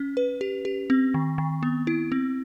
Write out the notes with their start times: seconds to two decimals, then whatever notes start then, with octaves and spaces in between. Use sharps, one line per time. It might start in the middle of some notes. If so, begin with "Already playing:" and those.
Already playing: C#4
0.17 B4
0.41 G4
0.65 G4
0.90 C4
1.14 D#3
1.38 D#3
1.63 B3
1.87 E4
2.12 C4